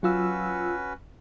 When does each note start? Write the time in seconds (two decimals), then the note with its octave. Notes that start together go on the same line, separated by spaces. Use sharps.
0.03 F#3 C#4 F4 F#4 B4 E6